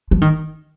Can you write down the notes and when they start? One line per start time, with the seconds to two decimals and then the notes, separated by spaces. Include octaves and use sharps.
0.11 F3
0.21 D#3